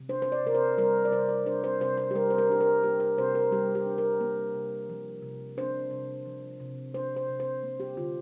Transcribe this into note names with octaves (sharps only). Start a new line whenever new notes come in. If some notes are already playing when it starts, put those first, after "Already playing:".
Already playing: C3
D4 C5
C5
D5
C3 A#4
C5
G3 A#4
D5
C3 C5
D5
D4 C5
C5
C3 C5
C5
G4
G3 A#4
C5
A#4
D4 G4
A#4
A#3 G4
A#4
C3 C5
A#4
G3 G4
G4
D4
A#4
A#3
C3
F3
C3
D4 C5
C3
F3
C3
D4 C5
C5
C3
C5
A#3
G4
D3 F4